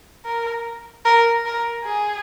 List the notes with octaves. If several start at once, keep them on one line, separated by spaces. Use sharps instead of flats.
A#4
A#4
A#4
G#4